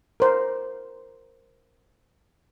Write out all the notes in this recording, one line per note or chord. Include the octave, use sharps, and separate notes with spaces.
A#4 C5